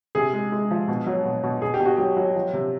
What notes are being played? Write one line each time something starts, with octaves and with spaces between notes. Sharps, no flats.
C3 G#4
G#3
G#3
F3
B2
F#3
B2
B2
B2 G#4
G4
B2
F#4
F#3 G4
F#3
F3
C3